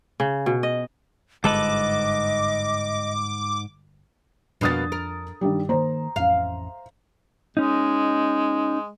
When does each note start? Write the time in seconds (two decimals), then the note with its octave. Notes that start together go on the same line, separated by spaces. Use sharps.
0.20 C#3
0.46 B2
0.63 D#5
1.44 G1 G#2 G#3 A4 B4 D#5 D6
4.61 F2 B2 A#3 B3 D4 D#6 A6
4.92 A#4
5.41 G2 D#3 G3
5.69 D#3 A#3 C5 A#5
6.16 A1 F2 C#4 F5
7.57 G#3 C#4 D#4